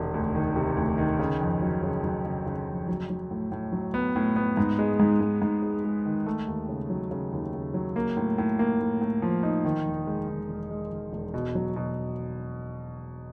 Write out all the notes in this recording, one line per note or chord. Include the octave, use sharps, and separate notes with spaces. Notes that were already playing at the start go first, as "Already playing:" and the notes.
Already playing: E1 C3 D#3
D2
D#3
C3
D2
D#3
C#3
F2
F#3
C#3
F#3
C#3
C#3
F2
F#3
F#3
A2
A2
F#3
B3
A2
B3
G#2
G#3
G#2
G#2
G#2
G#3
G#3
D#3
A3
D#2
C#3
F#3
C#3
D#2
C#3
F#3
A#3
A2
A2
A#3
A2
A2
F3
D#4
D#3
E1
G#3
D#3
E1
G#3
E1
E1
B2
F#3
B2